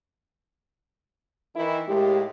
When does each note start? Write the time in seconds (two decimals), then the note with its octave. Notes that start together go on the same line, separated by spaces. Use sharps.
1.55 D#3 E3 E4
1.88 D#2 A2 G#3 G4